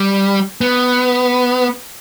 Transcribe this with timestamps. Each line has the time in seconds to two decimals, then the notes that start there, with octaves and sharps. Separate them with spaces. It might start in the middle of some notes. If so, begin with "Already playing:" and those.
Already playing: G3
0.61 B3